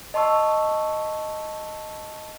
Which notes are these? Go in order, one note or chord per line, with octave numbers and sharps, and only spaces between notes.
D#5 A5 C6 C#6 E6